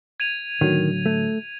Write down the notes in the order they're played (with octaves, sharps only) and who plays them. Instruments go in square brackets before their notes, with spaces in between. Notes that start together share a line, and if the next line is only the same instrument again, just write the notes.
[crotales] G#6 D#7 F7
[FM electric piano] A2 D3 F#3 [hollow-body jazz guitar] D#3
[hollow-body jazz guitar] A3